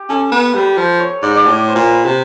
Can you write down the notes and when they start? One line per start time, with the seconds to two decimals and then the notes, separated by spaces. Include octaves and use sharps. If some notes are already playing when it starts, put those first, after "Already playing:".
Already playing: G4
0.09 C#4 A4
0.32 B3
0.54 G3 B4
0.77 F3
1.00 C#5
1.23 G#2 D5
1.35 D5
1.45 A2 C#5
1.68 C5
1.75 A#2
1.91 B4
2.05 C3